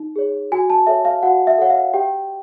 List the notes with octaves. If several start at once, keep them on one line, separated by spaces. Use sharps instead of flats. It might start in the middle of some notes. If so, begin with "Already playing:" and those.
Already playing: D#4
G#4 C#5
F#4 G#5
A5
A4 C#5 E5
F5
F#4 F#5
E5
A4 C#5 F#5
F5
G4 G5